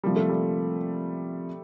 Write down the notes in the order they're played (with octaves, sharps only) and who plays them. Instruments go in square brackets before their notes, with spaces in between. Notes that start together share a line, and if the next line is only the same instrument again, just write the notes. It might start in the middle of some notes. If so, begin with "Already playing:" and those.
[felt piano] C3 F3 A#3 [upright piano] G3
[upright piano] A3
G3